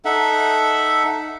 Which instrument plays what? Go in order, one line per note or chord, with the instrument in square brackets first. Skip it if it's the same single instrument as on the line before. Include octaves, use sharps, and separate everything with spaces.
[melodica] D#4 A4 E5 F#5